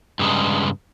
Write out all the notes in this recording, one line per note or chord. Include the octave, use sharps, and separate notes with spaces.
G2 C#3 G#3